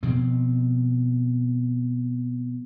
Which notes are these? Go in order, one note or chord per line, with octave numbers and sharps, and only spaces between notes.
B2 F3 C4